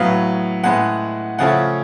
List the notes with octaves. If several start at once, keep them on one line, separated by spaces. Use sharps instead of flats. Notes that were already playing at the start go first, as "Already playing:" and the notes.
Already playing: A2 F#3 B3 F5
A2 G#3 B3 F#5
C#3 F3 A3 C#4 F#5